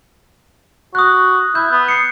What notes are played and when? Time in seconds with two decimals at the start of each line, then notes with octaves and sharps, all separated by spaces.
0.95 F#4 D#6 F#6
1.55 E4 G6
1.71 B3
1.88 C7 C#7